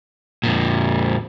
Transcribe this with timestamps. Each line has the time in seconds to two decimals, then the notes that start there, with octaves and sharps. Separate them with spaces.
0.43 F2 A#2